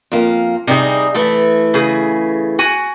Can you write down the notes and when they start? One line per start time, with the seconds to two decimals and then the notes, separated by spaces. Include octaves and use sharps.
0.12 F2 A#3
0.67 C3 G3 D#4 G#4
1.14 E3 A3 A4
1.74 C#3 G#4
2.59 F#4 G#5